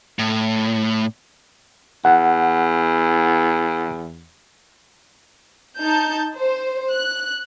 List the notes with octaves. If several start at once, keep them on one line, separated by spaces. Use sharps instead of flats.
A2
E2 F#5
D#4 A5 G6
C5
F#6